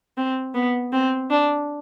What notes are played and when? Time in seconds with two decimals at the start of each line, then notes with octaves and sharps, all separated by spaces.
0.17 C4
0.54 B3
0.93 C4
1.30 D4